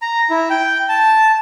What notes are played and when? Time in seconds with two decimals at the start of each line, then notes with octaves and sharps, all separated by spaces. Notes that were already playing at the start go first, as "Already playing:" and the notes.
0.02 A#5
0.30 E4
0.50 G5
0.89 A5